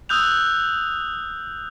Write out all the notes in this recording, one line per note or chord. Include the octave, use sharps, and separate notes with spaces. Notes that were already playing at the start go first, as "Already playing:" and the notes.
D#6 E6 F#6 G6 F7